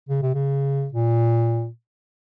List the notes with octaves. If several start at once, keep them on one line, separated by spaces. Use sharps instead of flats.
C#3
C3
C#3
A#2